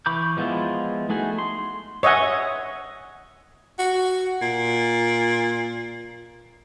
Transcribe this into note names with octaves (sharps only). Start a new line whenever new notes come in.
E3 B5 C#6 D6 G6
F3 G#3 B3 E4 F4
A3 D#4 F#4 G#4
C6
C#5 D#5 E5 F#5 G#5
F#4
A#2